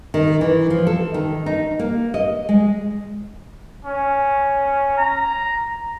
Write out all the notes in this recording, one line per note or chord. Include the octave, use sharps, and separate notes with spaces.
D#3
E3
F3
A4
D#3
D#4
A#3
D#5
G#3
C#4
A#5